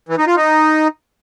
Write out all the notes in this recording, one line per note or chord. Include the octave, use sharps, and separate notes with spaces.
E3
D#4
F4
D#4